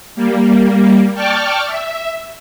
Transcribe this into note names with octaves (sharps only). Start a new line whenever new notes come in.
G3 A#3
D5 G5 A5 C#6 D6 F6
E5